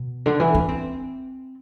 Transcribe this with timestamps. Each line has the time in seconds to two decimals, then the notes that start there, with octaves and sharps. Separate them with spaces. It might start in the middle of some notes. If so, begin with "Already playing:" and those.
Already playing: B2
0.26 D3
0.40 E3
0.54 D4
0.68 C4